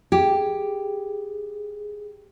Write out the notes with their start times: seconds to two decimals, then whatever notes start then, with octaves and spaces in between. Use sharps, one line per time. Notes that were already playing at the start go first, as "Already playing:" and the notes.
0.12 G4 G#4